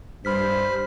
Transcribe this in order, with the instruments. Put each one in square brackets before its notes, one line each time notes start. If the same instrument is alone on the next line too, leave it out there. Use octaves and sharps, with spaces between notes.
[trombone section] G2 [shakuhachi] C5 [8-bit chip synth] B5 F6 B6